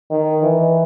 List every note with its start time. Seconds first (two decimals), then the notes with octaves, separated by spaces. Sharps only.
0.11 D#3
0.43 E3